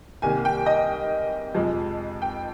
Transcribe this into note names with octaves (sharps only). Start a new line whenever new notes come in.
C2 C3 D#3 A#3 G#5
G5
D#5
F2 C3 F3 G#3
G5